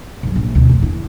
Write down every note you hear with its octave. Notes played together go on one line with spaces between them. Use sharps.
G#2 F#3
A#1
D2 B2
F2
E4